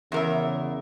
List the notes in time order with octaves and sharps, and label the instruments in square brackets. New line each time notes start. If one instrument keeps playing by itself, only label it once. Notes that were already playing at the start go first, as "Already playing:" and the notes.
[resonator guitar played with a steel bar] E2 A#4 E5 [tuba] C#3